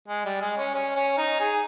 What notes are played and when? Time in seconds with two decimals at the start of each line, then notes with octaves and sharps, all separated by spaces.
0.08 G#3
0.25 G3
0.41 G#3
0.57 C#4
0.74 C#4
0.96 C#4
1.18 D#4
1.40 G#4